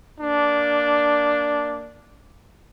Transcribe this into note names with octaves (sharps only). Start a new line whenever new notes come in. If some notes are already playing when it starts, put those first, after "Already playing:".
A#3 D4